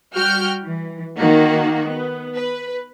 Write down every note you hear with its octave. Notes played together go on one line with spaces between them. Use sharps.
G3 F#4 G5 F6 G6
E3
D#3 A#3 F#4
B3
B4